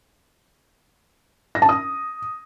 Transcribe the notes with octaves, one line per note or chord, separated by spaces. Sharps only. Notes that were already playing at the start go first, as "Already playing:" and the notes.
A#6
A5
D#6